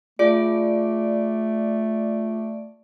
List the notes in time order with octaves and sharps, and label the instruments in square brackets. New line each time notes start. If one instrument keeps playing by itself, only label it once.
[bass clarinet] A3 [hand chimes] F4 G#4 [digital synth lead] D5